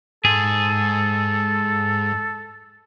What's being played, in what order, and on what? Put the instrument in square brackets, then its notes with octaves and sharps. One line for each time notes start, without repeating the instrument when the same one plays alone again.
[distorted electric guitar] G#2 [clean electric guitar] G#4 [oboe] A4